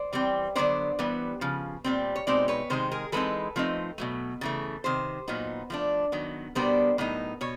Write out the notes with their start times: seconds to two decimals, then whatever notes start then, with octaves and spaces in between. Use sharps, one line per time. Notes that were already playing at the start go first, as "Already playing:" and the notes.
Already playing: C5 D5
0.13 E3 G3 C4
0.55 D3 F#3 B3 D4 C5 D5
0.99 E3 G3 B3
1.41 C#3 F3
1.84 A#2 G3 C4
2.16 C#5
2.27 B2 G#3 C4 D#4 C5 D5
2.48 B4 C#5
2.70 C3 D#3 G#3 D#4 C5
2.92 G#4 A#4
3.12 E3 G#3 C4 D#4 A4 B4
3.56 F3 A3 C4 D#4
3.98 B2 F#3 A3
4.41 C#3 E3 A3
4.84 C3 D#3 C5
5.28 A#2 F#3 B3 D#4
5.70 F3 A3 D4
6.12 D#3 F#3 B3
6.55 B2 G3 B3 D4 A#4 C5
6.98 A2 F#3 B3 D#4
7.41 B2 C#5